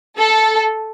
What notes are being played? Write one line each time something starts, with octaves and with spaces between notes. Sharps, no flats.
A4